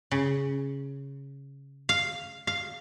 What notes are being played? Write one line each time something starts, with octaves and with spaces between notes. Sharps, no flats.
C#3
F5
F5